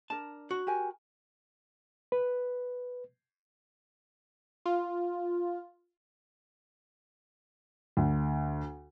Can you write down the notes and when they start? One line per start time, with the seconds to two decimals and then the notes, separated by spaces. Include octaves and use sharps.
0.10 D4 A#4 A5
0.51 F#4
0.67 G4 A#4 G#5
2.12 B4
4.66 F4
7.97 D2